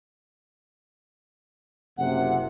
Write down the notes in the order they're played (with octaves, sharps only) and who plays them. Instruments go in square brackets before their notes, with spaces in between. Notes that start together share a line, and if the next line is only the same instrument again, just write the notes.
[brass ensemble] F#1 C3 [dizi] F#5